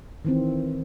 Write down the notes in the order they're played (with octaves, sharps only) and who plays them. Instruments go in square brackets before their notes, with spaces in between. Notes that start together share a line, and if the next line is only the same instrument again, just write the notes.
[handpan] D#3 E3 C4